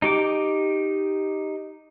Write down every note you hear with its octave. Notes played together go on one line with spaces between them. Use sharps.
D#4 G4 D6